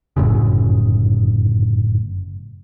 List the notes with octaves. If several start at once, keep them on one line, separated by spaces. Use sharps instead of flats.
G1 F#2 A2 C#3